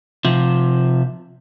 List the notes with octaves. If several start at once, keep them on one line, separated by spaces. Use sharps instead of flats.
C3 F3